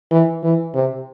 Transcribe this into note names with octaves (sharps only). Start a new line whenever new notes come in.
E3
E3
C3